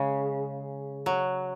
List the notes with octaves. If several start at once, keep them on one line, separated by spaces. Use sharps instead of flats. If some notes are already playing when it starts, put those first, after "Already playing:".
Already playing: C#3 G#3
F#3